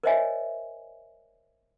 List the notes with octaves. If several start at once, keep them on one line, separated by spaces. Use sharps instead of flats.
A#4 C5 C#5 D#5 E5 G#5